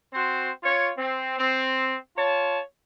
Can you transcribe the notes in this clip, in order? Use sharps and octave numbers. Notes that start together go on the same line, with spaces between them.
C4 F#4 C5
F4 C#5
C4
C4
F4 C#5 A5